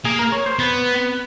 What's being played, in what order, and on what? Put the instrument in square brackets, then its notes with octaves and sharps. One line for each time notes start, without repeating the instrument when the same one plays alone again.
[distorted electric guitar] A#3 [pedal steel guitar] G#4
[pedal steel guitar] A#4
C#5
C5
[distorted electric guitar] B3 [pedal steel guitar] B4